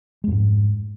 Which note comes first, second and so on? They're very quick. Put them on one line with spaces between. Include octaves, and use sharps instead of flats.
G#3 F2 G#2